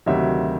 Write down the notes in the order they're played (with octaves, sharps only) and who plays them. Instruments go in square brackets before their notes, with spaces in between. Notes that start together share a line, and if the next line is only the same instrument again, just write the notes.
[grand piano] D2 C3 D#3 F#3 E5